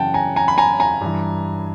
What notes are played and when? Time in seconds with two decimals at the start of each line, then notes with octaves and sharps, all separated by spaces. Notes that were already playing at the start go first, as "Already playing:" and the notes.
Already playing: F#2 C#3 E3 F#5 G5 A5
0.14 G#5 A#5
0.36 G#5 A#5
0.48 B5
0.58 G#5 A#5
0.80 G#5 A#5
1.01 G2 E3